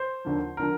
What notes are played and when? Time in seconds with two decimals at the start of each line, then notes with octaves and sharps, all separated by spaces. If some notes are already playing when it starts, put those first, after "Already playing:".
Already playing: C5
0.25 D#2 D3 F3
0.57 D3 F3 A#4